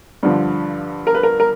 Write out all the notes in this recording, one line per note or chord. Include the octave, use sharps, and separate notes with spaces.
G2 D3 F3
A#4
B4
A#4
A#4